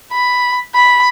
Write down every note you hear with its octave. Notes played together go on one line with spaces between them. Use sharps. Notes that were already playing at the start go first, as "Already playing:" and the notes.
B5
B5